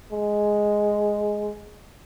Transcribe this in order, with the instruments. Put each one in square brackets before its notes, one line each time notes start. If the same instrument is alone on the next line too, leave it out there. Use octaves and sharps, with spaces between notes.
[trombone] G#3